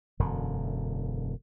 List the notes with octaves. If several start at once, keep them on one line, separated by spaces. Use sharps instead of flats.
E1 F#2 D3